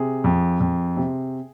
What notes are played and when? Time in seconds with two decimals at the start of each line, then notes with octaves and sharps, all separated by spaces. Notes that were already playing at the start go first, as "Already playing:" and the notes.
Already playing: C3 G#4
0.24 F2
0.60 F2
0.97 C3